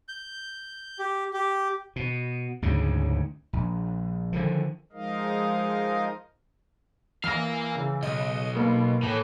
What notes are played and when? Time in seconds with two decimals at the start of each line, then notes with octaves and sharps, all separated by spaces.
0.08 G6
0.99 G4
1.34 G4
1.96 B2
2.62 D2 G#2 C#3
3.53 A#1
4.33 D3 D#3 F3
4.92 F3 G#3 D#4 A#4 D#5 F5
7.24 E3 A#4 F5 F6 A#6
7.75 C#3
8.03 B1 D#5
8.56 B2 A#3
9.03 A2 E3